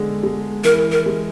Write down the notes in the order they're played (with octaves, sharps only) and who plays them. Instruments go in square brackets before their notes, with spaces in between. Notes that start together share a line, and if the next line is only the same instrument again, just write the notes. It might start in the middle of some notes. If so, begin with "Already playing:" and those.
Already playing: [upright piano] D3 G#3
G#3
[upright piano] E3 [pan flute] A#4
[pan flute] A#4
[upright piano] G#3